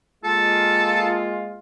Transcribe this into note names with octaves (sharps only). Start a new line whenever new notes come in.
G#3 A#3 F4 A4